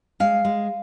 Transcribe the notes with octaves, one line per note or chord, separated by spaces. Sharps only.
G#3 F5
G#3